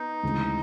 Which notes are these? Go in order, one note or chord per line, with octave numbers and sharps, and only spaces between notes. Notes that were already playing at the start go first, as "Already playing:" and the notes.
Already playing: B3 D#4
D2 C#3 E3 G#3 C4